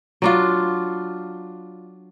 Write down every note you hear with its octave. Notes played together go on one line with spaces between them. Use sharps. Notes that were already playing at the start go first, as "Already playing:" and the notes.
F#3 D4 F4